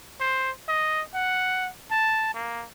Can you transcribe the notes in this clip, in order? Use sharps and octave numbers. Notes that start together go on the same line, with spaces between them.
C5
D#5
F#5
A5
A#3